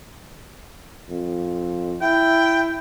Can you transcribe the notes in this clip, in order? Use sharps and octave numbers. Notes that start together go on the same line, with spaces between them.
F2
E4 G5